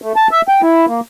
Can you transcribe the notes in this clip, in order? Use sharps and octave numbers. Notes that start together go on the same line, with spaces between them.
A3
A5
E5
G5
E4
A#3